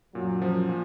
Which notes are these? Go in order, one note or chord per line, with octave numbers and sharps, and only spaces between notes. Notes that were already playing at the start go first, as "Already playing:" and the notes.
F#2 A#2 F#3
F3
A#2